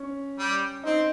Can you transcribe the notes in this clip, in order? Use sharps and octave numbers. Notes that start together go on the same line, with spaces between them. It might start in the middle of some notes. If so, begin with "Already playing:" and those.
Already playing: C#4
G3
C4 D#4